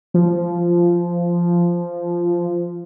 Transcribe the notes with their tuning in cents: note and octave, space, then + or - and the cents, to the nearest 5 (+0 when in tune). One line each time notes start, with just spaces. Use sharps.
F3 -10